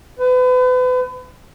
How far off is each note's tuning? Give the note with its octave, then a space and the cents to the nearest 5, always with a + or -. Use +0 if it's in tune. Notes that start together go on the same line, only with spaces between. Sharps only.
B4 +35